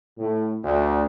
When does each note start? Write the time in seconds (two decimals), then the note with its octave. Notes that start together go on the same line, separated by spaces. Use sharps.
0.17 A2
0.63 D2